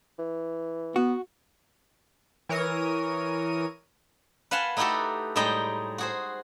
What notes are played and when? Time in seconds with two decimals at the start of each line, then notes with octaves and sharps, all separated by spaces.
0.19 E3
0.96 B3 F#4
2.49 E3 A#4 C#5 D#6 D#7
4.51 B4 F5 F#5 G#5 A5 C6
4.77 A3 D#4 E4 F#4 G4 A4
5.36 A2 G3 G#3 D#4 D#5 G5
5.98 F#4 G#4 C5